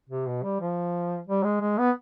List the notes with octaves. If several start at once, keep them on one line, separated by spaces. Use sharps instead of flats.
C3
B2
G3
F3
G3
G#3
G#3
B3